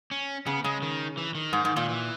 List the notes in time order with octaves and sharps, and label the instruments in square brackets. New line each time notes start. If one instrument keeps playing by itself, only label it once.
[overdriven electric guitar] C#4
[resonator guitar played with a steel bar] C#3 [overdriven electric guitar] B3
[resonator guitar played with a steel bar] C#3 [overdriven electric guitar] G#3
[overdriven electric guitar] D#3
E3
D#3
[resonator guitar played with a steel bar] G#2
G#2
[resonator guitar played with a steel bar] A#2 [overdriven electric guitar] D#3
[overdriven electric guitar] E3